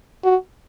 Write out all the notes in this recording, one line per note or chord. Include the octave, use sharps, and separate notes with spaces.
F#4